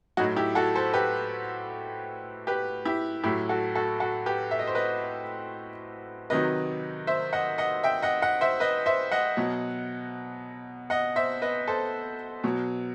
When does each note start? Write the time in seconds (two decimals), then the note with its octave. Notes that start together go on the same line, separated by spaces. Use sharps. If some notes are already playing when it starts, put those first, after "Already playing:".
0.17 A2 F#3 D#4 F#4
0.36 E4 G4
0.55 F#4 A4
0.75 A4 C5
0.94 G4 B4
2.47 G4 B4
2.85 E4 G4
3.24 A2 F#3 E4 G4
3.49 F#4 A4
3.75 F#4 A4
4.00 F#4 A4
4.26 G4 B4
4.51 E5
4.59 D#5
4.67 C5
4.75 B4 D#5
6.30 C3 D#3 F#3 B4 D#5
7.07 C5 E5
7.33 D#5 F#5
7.58 D#5 F#5
7.84 E5 G5
8.02 D#5 F#5
8.22 D#5 F#5
8.41 C5 E5
8.60 B4 D#5
8.86 C5 E5
9.11 D#5 F#5
9.37 B2 F#3
10.90 D#5 F#5
11.16 C5 E5
11.42 B4 D#5
11.68 A4 C5
12.44 B2 F#3